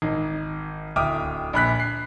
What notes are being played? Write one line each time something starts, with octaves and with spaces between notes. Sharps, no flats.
G#1 D#4
D1 E5 G5 D6 D#6 F6
A#1 B5 F#6 B6
C7